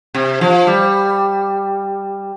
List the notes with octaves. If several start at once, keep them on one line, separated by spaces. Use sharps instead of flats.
C3
F3
G3